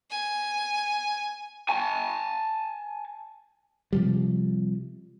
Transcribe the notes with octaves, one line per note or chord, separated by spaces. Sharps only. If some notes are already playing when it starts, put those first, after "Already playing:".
G#5
G#5 A5
C3 F3 G3